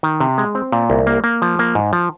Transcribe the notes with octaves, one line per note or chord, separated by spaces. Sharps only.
D#3
C3
G#3
C4
A#2
C2
A#3
A#3
F3
A#3
G#2
F3